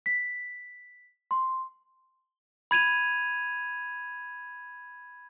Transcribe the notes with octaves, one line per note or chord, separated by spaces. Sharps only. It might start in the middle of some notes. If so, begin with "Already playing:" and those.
B6
C6
B5 G#6 D#7 F7